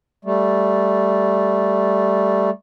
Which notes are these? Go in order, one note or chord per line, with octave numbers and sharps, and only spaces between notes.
G3 A3